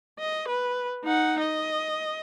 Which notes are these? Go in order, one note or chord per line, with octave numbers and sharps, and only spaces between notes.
D#5
B4
D#4 F#5
D#5